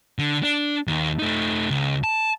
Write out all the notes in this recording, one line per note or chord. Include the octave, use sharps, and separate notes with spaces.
D3
D4
D#2
A3 D#4
C#2
A5